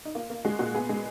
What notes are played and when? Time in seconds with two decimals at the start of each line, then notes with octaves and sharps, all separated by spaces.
0.05 D#4
0.15 A#3 F4
0.30 A#3
0.45 G#3 F#4
0.59 A#2 F#4
0.74 B3 G#4
0.89 G#3